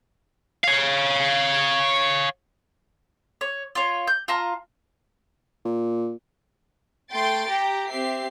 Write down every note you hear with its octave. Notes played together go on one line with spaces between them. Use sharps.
C#5 F5
C#5
F4 C#5
G6
F4 A5 A#5
A#2
A3 G5 C6 A6 C7 D7
G4 G5 A#5
C4 G4 E5 C7